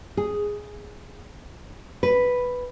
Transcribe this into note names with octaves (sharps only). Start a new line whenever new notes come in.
G#4
B4